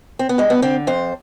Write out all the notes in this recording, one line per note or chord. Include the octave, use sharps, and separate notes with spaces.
C4
B3
G2 G#3
B3
D3 C4
F2 C5